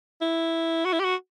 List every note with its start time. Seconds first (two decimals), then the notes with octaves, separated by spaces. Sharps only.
0.22 E4
0.85 F#4
0.93 E4
1.00 G4
1.04 F#4